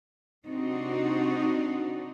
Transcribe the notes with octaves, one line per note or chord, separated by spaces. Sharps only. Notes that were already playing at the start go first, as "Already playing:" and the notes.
C3 C4 D4 D#4 F#4